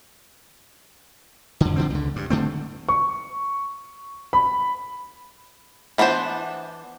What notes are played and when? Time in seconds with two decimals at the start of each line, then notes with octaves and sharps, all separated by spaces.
1.61 F2 D3
1.76 D3 F3 C4
1.90 C#2 D3
2.16 G2
2.30 D3 A3 C4
2.89 C#6
4.33 B5
5.98 E3 B3 D4 F#4 C5